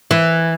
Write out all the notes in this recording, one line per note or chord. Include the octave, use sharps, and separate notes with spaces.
E3